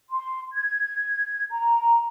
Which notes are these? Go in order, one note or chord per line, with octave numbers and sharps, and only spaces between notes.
C6
G#6
A#5